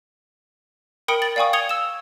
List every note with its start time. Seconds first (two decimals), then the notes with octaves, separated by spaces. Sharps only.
1.08 A#4 G5 B5 D#6 C#7 D7
1.22 A6 F#7
1.36 D5 F5 G5 G#5 C#6 D#6
1.53 D#6 G#6 C#7 F7 G7
1.69 E6 E7